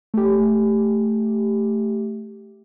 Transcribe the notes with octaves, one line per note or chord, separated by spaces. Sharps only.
A3 G4